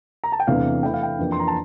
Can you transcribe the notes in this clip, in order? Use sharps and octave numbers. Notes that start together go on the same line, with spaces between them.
A#5
A5
G5
E2 C3 E3 A3 D4 F5
E3 A3 E4 G5
F5
G5
F2 E3 A#3 D4
C6
A#5
A5